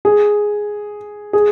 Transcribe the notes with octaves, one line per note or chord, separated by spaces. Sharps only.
G#4
G#4